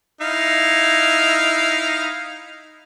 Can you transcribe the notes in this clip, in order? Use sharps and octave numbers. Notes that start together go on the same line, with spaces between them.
D#4 E4 F5